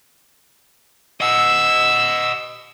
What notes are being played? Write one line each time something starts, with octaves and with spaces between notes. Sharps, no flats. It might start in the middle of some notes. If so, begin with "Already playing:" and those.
D#5 F#5 E6